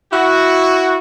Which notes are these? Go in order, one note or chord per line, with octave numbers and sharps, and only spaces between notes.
E4 F#4